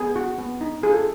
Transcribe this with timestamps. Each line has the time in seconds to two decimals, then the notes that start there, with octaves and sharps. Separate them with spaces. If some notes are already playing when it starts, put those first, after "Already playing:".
Already playing: B3 G#4
0.16 F#4
0.39 B3
0.61 D#4
0.83 F4 G#4
0.93 A4